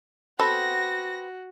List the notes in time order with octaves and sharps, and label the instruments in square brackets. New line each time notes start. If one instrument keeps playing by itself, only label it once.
[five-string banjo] B3 C4 B4 [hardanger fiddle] F#4 [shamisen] A4 [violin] A#6